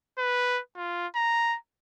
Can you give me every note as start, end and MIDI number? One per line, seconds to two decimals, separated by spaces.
0.18 0.61 71
0.77 1.07 65
1.16 1.57 82